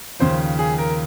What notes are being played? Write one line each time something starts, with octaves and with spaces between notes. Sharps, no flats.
D#2 C#3 F3 C5
G#4
A#4